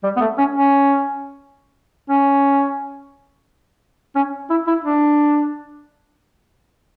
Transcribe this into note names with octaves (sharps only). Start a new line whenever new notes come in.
G3
B3
A3
C#4
C#4
C#4
C#4
E4
E4
D4